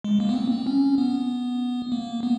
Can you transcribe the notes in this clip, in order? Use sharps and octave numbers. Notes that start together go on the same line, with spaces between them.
G#3
A#3
B3
C4
C4
C#4
B3
A#3
B3